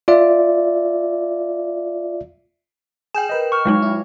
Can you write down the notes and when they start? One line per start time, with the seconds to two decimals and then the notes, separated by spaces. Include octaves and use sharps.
0.08 F4 D5 E5
3.14 G#4 G5 G6 E7
3.29 A#4 B4 D#5
3.52 C#6 F6
3.65 F#3 G#3 D#4
3.82 E4